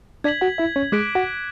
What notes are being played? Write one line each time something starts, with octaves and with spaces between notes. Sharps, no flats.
D4 D5 G#6 B6 F#7
F#4 F#5
E4 E5
C#4 C#5
G#3 G#4 D6 F#6 B6 D7
F#4 F#5